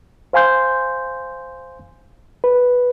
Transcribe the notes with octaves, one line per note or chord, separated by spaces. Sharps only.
C5 F5 G#5 C6 G6
B4